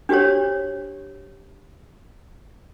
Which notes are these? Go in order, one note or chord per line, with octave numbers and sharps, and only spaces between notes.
D4 F#4 G4 C5 C#5